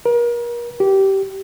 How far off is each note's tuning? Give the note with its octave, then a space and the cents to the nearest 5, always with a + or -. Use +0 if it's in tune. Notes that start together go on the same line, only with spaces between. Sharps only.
A#4 +35
G4 -15